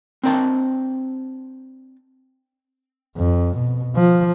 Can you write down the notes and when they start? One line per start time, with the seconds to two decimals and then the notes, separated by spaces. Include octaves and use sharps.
0.23 C4 D4 A#4 C5 A5
3.17 F2
3.57 B2
3.96 F3